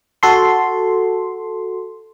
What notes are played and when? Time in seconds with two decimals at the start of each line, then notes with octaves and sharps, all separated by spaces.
0.23 F#4 A4 C6